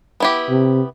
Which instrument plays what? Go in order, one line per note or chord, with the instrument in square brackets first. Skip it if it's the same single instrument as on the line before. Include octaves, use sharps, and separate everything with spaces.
[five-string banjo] B3 E4 G4
[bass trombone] C3